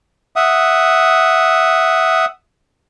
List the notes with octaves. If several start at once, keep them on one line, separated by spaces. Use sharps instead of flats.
E5 F#5 D#6